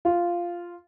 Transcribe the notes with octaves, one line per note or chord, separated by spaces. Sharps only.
F4